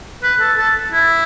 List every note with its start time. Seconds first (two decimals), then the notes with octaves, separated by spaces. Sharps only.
0.23 B4
0.40 A4
0.58 A4
0.92 E4